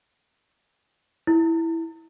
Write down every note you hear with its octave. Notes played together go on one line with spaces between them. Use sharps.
E4